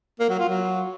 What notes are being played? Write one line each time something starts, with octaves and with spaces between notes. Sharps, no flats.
A#3
F#3
F4
F#3